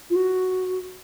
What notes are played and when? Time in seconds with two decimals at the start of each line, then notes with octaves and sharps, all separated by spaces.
0.10 F4
0.16 F#4